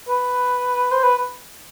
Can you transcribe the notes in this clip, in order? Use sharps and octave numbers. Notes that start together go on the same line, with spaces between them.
B4
C5
B4